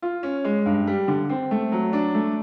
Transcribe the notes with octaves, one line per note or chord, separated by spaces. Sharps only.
F4
C#4
G#3
G2
G3
D3
C4
A3
F#3
D4
A3